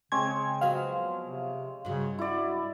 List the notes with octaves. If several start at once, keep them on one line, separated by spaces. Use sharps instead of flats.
C#3 G#3 C4 C#5 G#6
F3 F#3 B3 F5
C3
G2 C#3 F#3
E4 F#4 D5